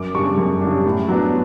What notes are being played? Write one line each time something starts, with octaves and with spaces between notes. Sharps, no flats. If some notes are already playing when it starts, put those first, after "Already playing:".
Already playing: F#2 D6
C#3 G3 D4 C#6
F#2
C#3 G3 D4
A2
F#3 B3 D4